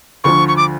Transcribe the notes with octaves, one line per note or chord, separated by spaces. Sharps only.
D2 D3 F3 C#6
C#6
D6